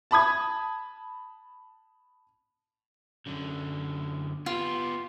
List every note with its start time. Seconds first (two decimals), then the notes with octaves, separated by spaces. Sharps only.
0.11 A5 B5 D#6 G#6
3.26 F#2 D3
4.46 B3 F4 G4